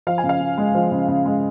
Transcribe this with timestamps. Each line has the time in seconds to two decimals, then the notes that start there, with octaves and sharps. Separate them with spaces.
0.07 F3 F5
0.18 G#5
0.24 C#3
0.29 F5
0.40 C#3
0.58 G#3
0.75 F3
0.92 C#3
1.08 C#3
1.26 G#3